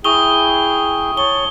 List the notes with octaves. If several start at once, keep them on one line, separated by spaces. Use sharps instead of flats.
E4 G#4 G5 C#6 D#6 G7
C#5 A5 C#6 G7